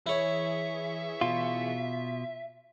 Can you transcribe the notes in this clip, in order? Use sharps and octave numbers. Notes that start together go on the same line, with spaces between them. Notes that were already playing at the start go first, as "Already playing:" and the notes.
E3 E4 G#4 C#5 E5 C#6
B2 F4